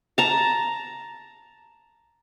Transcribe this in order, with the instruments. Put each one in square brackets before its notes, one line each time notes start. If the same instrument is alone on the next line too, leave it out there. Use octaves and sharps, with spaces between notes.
[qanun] A5 A#5